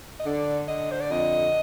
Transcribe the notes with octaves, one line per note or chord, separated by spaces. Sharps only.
D#5
D3 D5
D3 D#5
C5
D5
F2 D#5